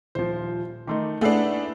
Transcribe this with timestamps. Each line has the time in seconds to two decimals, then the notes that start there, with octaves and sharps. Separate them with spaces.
0.15 D#1 F3 C5
0.87 D#3 A3 D#4 C6 D6
1.21 A3 D4 E4 G#4 B4 F#5 E6 C7